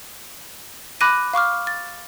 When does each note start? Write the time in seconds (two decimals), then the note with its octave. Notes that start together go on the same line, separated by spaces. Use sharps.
1.01 B5 D6 F#6 A#6 D#7
1.33 F5 C#6 D6 F6
1.67 A6